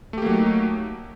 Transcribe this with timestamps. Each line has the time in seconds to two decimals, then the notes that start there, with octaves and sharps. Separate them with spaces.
0.13 A3
0.18 G4
0.22 A#3
0.26 F#3
0.31 D#4